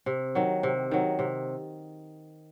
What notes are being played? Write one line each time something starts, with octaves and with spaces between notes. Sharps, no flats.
C3
D#3 F#3
C3
D#3 F#3
C3